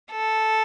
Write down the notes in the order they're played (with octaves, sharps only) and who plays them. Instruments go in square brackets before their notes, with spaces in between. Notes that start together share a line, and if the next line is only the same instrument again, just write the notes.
[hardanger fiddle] A4